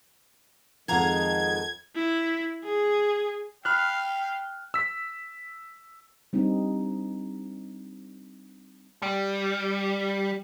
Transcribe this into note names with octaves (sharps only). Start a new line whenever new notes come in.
F2 D#3 G#3 F5 F#5 A#5 G#6
E4
G#4
F5 G5 B5 F6 F#6
E6 B6
G3 C4 D4 D#4
G3